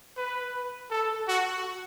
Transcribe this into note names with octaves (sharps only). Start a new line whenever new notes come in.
B4
A4
F#4